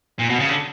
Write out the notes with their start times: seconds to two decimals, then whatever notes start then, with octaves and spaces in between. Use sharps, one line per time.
0.19 A#2
0.29 B2
0.40 C#3
0.50 D3